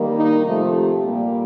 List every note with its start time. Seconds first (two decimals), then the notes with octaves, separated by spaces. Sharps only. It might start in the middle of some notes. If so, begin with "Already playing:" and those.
Already playing: D#3 G3 A#3
0.17 D#4
0.45 C3 F3 A3
0.75 G4
1.03 A#2 G3 A#3